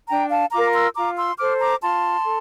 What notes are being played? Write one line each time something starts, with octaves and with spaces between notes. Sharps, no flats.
D4 G5 A#5
F5 A5
F4 A#4 A#5 D6
C6 E6
F4 A#5 D6
C6 E6
A4 C5 D6 F6
A#5 D6
F4 A5 C6
A4